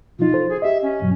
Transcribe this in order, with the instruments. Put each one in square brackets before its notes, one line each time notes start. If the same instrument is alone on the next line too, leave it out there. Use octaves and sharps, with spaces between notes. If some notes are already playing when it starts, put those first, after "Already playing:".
[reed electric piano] B2 F3 D#4 [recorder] F4
[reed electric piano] A4 C5
[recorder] G#4
[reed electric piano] G4 D#5 [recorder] E5
[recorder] C#4
[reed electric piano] G2 B2 F#3